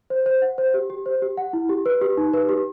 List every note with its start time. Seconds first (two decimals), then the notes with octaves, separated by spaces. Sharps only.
0.10 C5
0.26 C5
0.42 F#5
0.58 C5
0.74 G4
0.90 G4
1.06 C5
1.22 G4
1.38 F#5
1.53 E4
1.69 G4
1.86 B4
2.01 G4
2.17 D#4
2.33 B4
2.49 G4